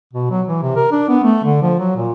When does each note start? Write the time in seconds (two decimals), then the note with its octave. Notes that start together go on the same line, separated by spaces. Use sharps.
0.14 B2
0.31 F#3
0.47 E3
0.62 C3
0.76 A#4
0.92 D4
1.09 B3
1.24 A3
1.44 D3
1.62 F3
1.79 F#3
1.96 A#2